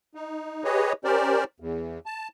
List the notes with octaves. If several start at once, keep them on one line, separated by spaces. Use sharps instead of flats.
D#4
G4 G#4 B4 C#5 D#5
C#4 G4 A#4 C5 D5
E2
A5